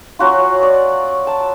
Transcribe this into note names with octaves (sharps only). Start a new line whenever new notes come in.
F#3 C#4 F4 F#4
D5
A5